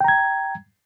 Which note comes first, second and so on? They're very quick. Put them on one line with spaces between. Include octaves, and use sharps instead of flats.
G5 A#5 G#6